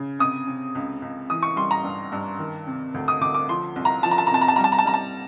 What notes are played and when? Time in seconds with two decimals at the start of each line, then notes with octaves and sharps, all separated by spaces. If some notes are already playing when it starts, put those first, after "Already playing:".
Already playing: C#3
0.19 C3 D#6
0.47 C3
0.75 C#2
1.02 C#2
1.30 E3 D#6
1.43 C#6
1.56 G3 C6
1.71 A#5
1.84 G2
2.12 G2
2.39 D#3
2.67 C3
2.94 D2
3.08 D#6
3.21 D2 D6
3.34 D6
3.49 F3 C6
3.76 C2
3.85 A#5
4.03 F3 A5
4.11 A#5
4.18 A5
4.27 A#5
4.31 C3 A5
4.41 A#5
4.48 A5
4.56 G3 A#5
4.64 A5
4.72 A#5
4.78 A5
4.85 G3 A#5
4.94 A5